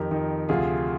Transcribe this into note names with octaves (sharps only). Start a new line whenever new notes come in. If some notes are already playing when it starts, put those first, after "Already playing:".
Already playing: F2 D#3 G4 A#4
F2 D#3
D2 C3 F3 F4 G#4